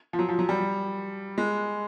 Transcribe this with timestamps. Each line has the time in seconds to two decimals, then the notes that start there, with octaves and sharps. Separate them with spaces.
0.13 F3
0.19 F#3
0.29 F3
0.39 F#3
0.49 G3
1.38 G#3